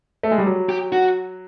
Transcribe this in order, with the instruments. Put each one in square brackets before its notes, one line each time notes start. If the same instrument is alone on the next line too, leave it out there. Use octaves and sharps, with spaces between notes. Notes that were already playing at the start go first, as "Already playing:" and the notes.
[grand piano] A3
G#3
G3
F#3
[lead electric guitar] G4
F#4